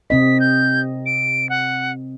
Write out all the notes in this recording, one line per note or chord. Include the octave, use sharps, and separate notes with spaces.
C3 C4 D#5 B6
G6
D7
F#5